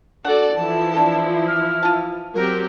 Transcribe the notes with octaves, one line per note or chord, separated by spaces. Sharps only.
D4 F#4 A4 D5 F#5
E3 F3 E4 A5
D4 A4
F6
F4 A5
F#3 C4 G4 A#4